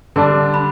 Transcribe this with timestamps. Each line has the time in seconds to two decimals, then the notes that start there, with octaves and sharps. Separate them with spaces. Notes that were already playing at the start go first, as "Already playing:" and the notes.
0.16 D3 G3 D4 A5
0.54 B5